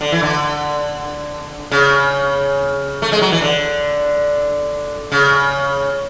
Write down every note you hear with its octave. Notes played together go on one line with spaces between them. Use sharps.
D3
E3
D3
C#3
A3
G#3
F#3
E3
D3
C#3